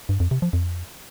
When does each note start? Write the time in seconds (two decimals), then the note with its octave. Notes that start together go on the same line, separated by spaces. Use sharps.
0.09 G2
0.20 F2
0.31 C3
0.42 F3
0.53 F2